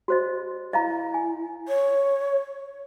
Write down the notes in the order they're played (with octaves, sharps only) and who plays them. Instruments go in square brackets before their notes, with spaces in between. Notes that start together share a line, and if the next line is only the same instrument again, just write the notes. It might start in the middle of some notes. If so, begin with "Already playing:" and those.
[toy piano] F#4 C5 D#5
[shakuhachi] E4 [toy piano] D#5 F5 A#5
[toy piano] G#5
[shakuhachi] C#5